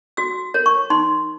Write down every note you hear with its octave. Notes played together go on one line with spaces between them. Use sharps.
F#4 E6
A#4 C#5
C#6
D#4 C6